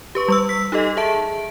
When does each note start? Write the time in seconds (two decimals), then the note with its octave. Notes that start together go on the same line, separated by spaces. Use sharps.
0.15 G4 B4 C#6
0.28 G3 C#6 E6
0.49 E6 B6
0.72 D#4 G4 A4 D#5
0.97 G#4 E5 A5 D7